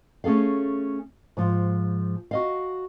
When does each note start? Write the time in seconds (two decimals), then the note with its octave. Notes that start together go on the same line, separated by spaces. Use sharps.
0.24 A3 C#4 G#4 A4 F5
1.37 G#2 F3
2.31 F#4 D#5 F5